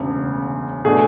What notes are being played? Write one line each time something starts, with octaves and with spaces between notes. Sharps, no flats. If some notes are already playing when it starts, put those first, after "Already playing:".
Already playing: E1 D2 C#3
B2 A3 D4 G#4